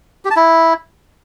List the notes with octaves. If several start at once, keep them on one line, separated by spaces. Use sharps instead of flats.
G4
A5
E4